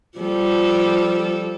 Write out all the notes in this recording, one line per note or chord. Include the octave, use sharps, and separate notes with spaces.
F3 G3 A4